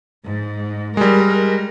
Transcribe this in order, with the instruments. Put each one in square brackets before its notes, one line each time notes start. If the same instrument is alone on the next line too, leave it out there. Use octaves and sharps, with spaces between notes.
[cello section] G#2
[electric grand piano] G3 G#3 [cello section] A#4